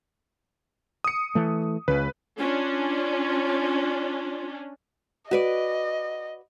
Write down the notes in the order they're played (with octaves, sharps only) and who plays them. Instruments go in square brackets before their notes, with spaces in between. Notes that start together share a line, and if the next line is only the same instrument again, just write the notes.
[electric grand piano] D#6 C#7
[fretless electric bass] E3 A3
[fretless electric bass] C#2 C#3 [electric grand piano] B4
[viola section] C#4 D4 [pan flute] F4
[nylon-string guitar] F#4 B4 D5 [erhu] D#5